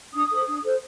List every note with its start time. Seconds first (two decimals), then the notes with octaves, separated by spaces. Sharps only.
0.14 D4 D#6
0.31 A4 C5
0.48 D4
0.64 A4 C5